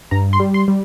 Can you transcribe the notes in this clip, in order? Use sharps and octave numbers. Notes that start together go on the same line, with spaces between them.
G2 A#5
C6
G3
C6
G3